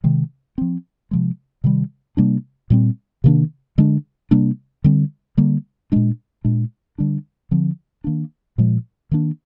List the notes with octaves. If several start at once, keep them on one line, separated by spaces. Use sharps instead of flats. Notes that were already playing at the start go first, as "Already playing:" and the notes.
C3 D#3 G#3
F3 C4
C3 F3 G#3
C3 D#3 G3
C3 G3 A#3 D4
A#2 G3 C4
C3 D#3 A#3 D4
D3 G#3 D4
C3 G3 A#3 D4
D3 G3 C4
D3 G3 A#3
A#2 G#3 D4
A#2 G#3 D4
D3 G3 D4
D3 F3 C4
D#3 A#3 D4
A#2 F3 G#3
D#3 A#3 D4